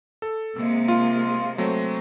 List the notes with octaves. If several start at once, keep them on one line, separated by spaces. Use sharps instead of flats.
A4
C3 G#3 A#3 E6
F4
F#3 A3 C4